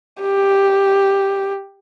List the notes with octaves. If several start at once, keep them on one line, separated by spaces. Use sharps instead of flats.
G4